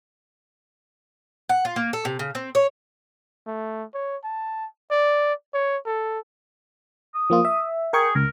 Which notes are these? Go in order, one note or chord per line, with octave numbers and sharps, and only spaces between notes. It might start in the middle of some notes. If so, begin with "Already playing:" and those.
F#5
F4
A#3
A4
C3
C#3
C4
C#5
A3
C#5
A5
D5
C#5
A4
D#6
F3 A#3 F4
E5
G#4 A#4 G5 C#6
C#2 A#4